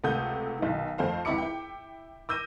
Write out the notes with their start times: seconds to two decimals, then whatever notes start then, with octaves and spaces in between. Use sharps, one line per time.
0.04 C#2 C3 A3 F#5 D#6 G6
0.59 B1 D#3
0.98 F2 A3 C5 F5
1.25 C#2 C4 E4 B5 D6 C#7
1.38 E4 G5
2.29 D6 E6 G6 A#6 D#7